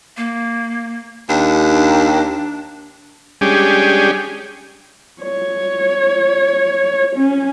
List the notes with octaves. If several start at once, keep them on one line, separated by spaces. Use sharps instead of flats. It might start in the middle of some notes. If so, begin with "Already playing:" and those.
A#3
D#2 D4
G3 G#3 C#4 D4 G4 G#4
C#5
C#4